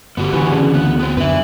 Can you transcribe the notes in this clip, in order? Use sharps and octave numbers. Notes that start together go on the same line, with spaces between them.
G1 B3 F#4 G4
D3 E3 B4 G#5 C#6
C#3 D4
D2 B3 F#6
B3 C4
F#2 D3 B4 E5